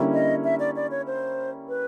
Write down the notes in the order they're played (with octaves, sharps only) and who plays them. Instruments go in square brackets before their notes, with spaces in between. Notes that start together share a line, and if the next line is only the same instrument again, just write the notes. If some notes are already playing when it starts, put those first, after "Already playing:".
Already playing: [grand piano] D3 G3 A#3 C#4 E4
[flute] D#5
E5
D5
D5
C#5
C5
B4